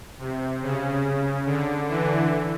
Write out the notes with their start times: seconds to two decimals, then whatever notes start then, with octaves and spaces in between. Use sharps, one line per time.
0.19 C3
0.62 C#3
1.46 D3
1.88 D3 E3